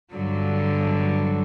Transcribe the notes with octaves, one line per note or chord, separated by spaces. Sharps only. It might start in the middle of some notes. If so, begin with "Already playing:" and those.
G2 D3 F#3